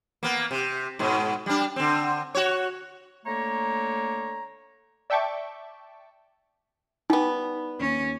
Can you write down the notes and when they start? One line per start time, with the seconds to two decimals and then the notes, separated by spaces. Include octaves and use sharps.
0.23 A#3 B3
0.51 C3
0.99 G#2 B2
1.46 G3 D4
1.76 D3 C4
2.35 F#4 C#5
3.25 D3 A3 A#3 C#5 A#5
5.10 D5 E5 G5 A5 C#6 D6
7.10 G3 B3 D#4
7.79 D#2 C#4